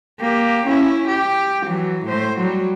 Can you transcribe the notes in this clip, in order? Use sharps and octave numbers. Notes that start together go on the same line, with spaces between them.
A#3 G4
C#4 E4
G4
E3 F#3
A2 C5
F#3 G3